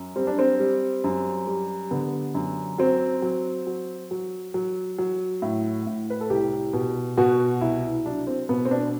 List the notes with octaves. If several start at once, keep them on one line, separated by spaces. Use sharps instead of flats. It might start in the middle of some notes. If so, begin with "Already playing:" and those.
Already playing: F#2
G3 C4
D4
C4
G3
F#2
G3
D3 B3
F#2
F#3 C4
F#3
F#3
F#3
F#3
F#3
A2
A2
B4
A4
C2 G4
B2
B2 F#4
C2 E4
F#3 D4
C4
B2 B3
C4
D4